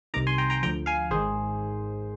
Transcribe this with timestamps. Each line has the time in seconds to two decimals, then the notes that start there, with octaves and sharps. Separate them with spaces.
0.14 C2 C3 D#3 A#5 D6
0.27 G#5 C6
0.38 G5 A#5
0.50 G5 A#5
0.63 D2 D3 F3 G5 A#5
0.86 F5 G#5
1.11 G#1 G#2 D#3 G#4 C5